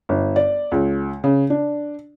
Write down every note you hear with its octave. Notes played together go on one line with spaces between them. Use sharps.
G1
D5
C#2
C#3
D4